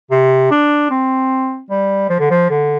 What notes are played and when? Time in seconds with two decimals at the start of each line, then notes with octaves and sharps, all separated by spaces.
0.11 C3
0.51 D4
0.90 C4
1.70 G3
2.09 F3
2.19 D3
2.30 F3
2.50 D3